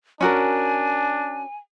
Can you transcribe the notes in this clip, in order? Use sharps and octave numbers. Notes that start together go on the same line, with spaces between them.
C#4 D4 F#4 A#4 G#5